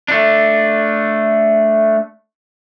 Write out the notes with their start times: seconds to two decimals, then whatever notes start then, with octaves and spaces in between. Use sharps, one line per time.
0.08 A3 D4